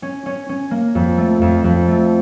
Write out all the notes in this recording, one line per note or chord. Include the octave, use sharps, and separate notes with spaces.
C#4
C#4
C#4
A#3
F2
A3
F2
F2
A3